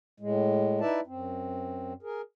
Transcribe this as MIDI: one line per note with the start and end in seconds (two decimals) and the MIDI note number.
0.20 0.80 45
0.20 0.80 56
0.81 1.00 63
0.81 1.00 64
0.81 1.00 71
0.81 1.00 74
0.81 1.00 76
0.81 1.00 81
1.07 1.93 42
1.07 1.93 60
2.03 2.21 68
2.03 2.21 70